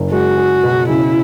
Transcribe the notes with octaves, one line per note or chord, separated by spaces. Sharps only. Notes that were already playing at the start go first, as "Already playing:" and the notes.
Already playing: F#1
G#3 F#4
G#4
B2
C#3 E4